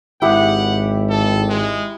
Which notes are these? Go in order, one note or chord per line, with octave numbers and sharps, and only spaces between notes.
G#1 E4 G4 F#5 D#6
A4
G#3